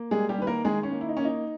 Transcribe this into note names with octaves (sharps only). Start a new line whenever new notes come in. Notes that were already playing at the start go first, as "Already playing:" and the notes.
Already playing: A#3
G3 G#3 G#4
G3 G4
D#3 B4
A#3 A#4
D#3 G#3 G#4
C#4
A#3
E4
D#4
A#3 C#4
D#4